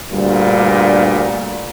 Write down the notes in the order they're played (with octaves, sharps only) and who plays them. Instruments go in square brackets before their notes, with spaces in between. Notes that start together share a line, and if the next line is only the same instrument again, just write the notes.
[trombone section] D2 G2 A#2 G3